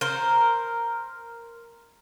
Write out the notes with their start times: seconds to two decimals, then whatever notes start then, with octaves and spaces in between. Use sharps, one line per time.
0.01 A#4 C5